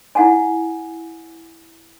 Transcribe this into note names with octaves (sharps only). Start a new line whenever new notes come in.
E4 F#5 G#5